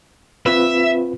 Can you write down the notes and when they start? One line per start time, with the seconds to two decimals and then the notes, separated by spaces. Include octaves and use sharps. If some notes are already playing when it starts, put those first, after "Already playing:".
0.46 C4 F4 B4 E5